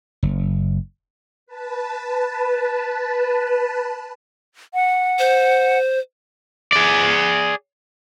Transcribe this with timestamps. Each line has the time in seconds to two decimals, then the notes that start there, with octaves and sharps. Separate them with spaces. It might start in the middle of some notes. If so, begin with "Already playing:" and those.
0.23 F#1
1.46 B4 A5
4.74 F#5
5.19 C5
6.73 G#4 D5